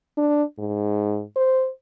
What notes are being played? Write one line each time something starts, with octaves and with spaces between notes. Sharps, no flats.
D4
G#2
C5